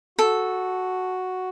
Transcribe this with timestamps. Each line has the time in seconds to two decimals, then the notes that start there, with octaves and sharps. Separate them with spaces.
0.19 F#4 A4